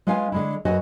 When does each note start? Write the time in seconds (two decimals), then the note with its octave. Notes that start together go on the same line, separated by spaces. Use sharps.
0.07 G#3 C#4 F4 B4 F5 G#5
0.32 D3 G#3 E4
0.65 F#2 F#4 B4 C#5 D#5 G#5